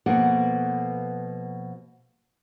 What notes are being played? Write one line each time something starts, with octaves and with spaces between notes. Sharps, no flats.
B2 F3 A#3 F#4 A4 F#5